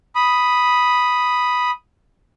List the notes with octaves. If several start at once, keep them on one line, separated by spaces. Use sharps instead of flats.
B5 D#6